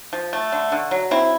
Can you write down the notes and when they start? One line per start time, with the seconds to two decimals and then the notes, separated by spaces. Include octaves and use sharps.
0.13 F3
0.33 A3
0.52 D3
0.72 D3
0.91 F#3
1.11 C4 E4